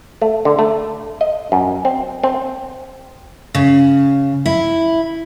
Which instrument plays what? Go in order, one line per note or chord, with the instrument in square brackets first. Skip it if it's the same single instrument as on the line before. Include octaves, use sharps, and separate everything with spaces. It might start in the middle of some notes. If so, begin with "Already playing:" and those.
[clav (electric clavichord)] A3
D3
A3
D#5
F#2
C4
C4
[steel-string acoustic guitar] C#3
E4